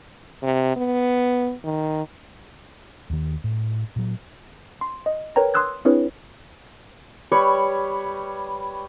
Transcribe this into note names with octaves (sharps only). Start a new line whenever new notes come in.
C3
B3
D#3
D#2 D#3
A2
A#2 F#3
C6
D#5
A#4 B4 C#5 G5 A#5
C6 D#6 E6 F#6 G#6
C4 D4 E4 G#4 B4 C#5
G3 B4 C#5 C#6